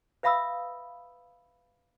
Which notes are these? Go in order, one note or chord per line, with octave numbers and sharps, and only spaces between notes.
B4 E5 F5 B5 D#6 E6